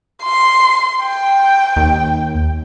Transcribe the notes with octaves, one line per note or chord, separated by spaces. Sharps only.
C6
G5
D#2